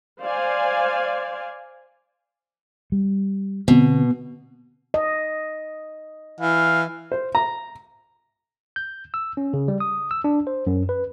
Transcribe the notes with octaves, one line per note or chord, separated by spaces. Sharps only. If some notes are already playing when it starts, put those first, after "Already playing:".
C5 D5 F5 G#5
G3
B2 D3 C4
D#5
E3 F5
C5
A#5
G6
E6
C#4
C#3
G3
D#6
E6
D4
C5
F#2
B4